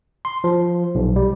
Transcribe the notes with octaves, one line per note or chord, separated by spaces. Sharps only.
C6
F3
B1
G3